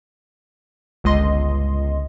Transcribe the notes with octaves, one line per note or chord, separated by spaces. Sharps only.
G1 C#2 D#5 C6